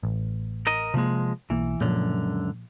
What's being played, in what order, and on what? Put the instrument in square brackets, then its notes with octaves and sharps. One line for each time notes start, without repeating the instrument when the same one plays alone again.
[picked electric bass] A1
[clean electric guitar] A#4 D#5
[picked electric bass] C3 A#3 [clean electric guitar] F3 G#3
[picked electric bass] B1 A#3 [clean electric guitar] E3
[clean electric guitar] C#2 F#2 D3 [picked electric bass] A#2 F3